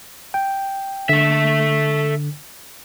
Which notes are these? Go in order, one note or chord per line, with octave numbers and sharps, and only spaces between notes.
G5
D3 A4 E5